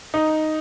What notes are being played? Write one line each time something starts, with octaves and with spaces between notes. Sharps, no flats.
D#4